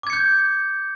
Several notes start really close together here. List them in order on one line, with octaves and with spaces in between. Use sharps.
D6 G#6 C#7 G6